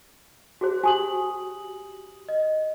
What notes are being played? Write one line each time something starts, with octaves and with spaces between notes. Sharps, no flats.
F#4 G#4 C5
F#4 G4 G#5 D#6 F#7
D#5